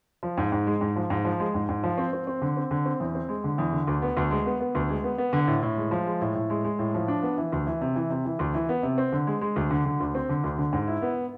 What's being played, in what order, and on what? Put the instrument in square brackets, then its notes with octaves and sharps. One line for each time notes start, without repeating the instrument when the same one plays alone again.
[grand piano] F3
G#2
G#2
G#3
G#2
F3
G#2
F3
G#3
G#2
G#2
F3
C4
C4
C4
D3
C4
D3
C4
E2
C4
G#3
D3
E2
D3
D2
B3
D2
G#3
B3
B3
D2
G#3
B3
B3
D3
A2
A2
G#3
F3
G#3
A2
A2
G#3
G#3
A2
F3
D4
B3
E3
D2
E3
C3
E3
C3
E3
D2
E3
B3
C3
C4
D3
G#3
G#3
D2
D3
D3
D2
C4
D3
D2
D3
G#2
E4
B3